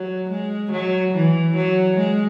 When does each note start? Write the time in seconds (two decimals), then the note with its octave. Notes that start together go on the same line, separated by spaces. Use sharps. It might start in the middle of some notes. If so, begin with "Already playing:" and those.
Already playing: F#3
0.30 G#3
0.72 F#3
1.15 E3
1.56 F#3
1.97 G#3